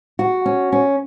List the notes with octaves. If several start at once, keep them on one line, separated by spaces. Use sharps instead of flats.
F#4
C#4
C#4